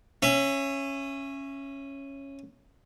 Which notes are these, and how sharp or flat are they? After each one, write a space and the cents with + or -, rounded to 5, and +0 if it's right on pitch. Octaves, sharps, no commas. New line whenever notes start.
C#4 -10 E5 +25